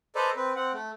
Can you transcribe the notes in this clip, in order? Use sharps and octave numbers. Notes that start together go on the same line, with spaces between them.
A4 B4 C5 D5 D#5 A#5
C4 B4
C4 F#5
A3